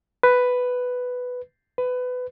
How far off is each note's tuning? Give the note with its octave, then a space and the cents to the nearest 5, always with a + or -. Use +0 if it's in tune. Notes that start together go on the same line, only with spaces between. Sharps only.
B4 +5
B4 +20